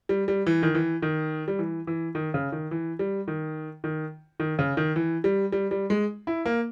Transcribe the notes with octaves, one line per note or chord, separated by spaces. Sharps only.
G3
G3
E3
D#3
E3
D#3
G3
E3
E3
D#3
C#3
D#3
E3
G3
D#3
D#3
D#3
C#3
D#3
E3
G3
G3
G3
G#3
E4
A#3